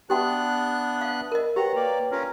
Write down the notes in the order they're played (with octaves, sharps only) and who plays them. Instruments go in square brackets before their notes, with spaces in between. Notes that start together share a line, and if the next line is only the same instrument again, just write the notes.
[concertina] B3 D4 F#6 [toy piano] G4 G5 C6 [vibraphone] E5 D#6
[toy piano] F5
[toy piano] A#4 D#5 [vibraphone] E6
[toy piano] G4 [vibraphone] B4 C#5 G5 [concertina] F#5 A#5
[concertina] A#3 D5
C#4 F4 A#4